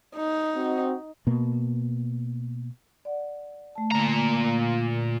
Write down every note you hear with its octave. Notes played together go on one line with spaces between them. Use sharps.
D#4
C4 F#4
B2 A#3
D5 F#5
A3 A5
A#2 D3 A#5